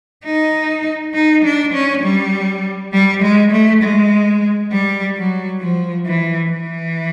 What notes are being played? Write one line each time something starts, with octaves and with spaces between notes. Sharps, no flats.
D#4
D#4
D4
C#4
G3
G3
G#3
A3
G#3
G3
F#3
F3
E3
E3